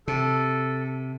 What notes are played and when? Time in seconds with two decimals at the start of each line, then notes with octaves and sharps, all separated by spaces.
0.08 C3 A4